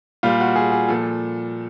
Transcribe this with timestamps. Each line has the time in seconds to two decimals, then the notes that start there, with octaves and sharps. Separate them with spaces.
0.23 A#2 G3 F4
0.40 F#4
0.56 G#4
0.72 G#4
0.88 A#2 F3 A4